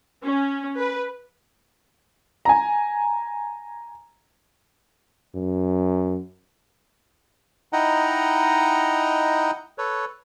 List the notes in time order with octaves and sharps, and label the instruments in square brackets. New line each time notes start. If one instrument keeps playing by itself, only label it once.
[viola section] C#4
B4
[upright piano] G#5 A#5
[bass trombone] F#2
[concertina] D#4 E4 D#5 F#5 G5 A#5
A4 B4 C#5